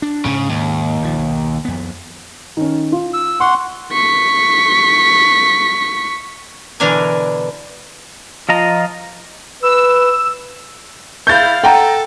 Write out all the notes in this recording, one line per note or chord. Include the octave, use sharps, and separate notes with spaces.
D4
G#2 C#3
D#2
A#1 F3
B1
F2 B3
D#3 C#4
F4
E6
F#5 C6 C#6
C#6 B6
B2 D3 E3 D4 A#4 G#5
F3 F4 D#5 A#5
B4 E6
E4 F5 G6 A6
A4 F#5 G5 A#5